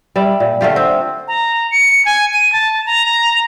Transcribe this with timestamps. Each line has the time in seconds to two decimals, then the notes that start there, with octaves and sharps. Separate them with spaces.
0.16 G3 D5 E5
0.40 A#2
0.61 D3 A3 F4 G4
0.76 C4
1.28 A#5
1.71 C#7
2.06 G#5
2.33 D#7
2.53 A5
2.86 A#5